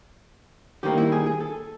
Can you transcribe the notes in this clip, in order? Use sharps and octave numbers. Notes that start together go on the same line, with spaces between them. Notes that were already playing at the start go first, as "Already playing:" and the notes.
D#3 G3 A#3 D#4 G4
E4
G#4
G#4
A4